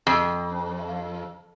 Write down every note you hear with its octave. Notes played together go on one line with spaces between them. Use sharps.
F2